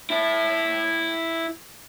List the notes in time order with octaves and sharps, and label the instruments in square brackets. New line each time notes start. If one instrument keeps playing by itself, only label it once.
[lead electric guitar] E4 A5